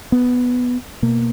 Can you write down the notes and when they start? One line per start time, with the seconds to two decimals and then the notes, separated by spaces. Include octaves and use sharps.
0.12 B3
1.02 B2 A#3